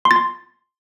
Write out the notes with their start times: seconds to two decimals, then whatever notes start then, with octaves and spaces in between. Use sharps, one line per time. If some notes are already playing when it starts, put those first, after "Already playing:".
0.05 C6
0.11 A6
0.16 C6